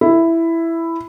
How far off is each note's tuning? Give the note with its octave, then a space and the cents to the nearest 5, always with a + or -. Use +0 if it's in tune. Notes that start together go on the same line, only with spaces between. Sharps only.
E4 +5